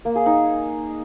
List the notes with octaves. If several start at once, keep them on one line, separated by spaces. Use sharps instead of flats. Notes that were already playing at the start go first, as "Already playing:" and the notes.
A#3
G#4
D#4